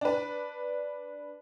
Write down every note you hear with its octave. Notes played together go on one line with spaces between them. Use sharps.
D4 B4